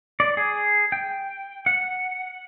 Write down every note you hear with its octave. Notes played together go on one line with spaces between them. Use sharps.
D5
G#4
G5
F#5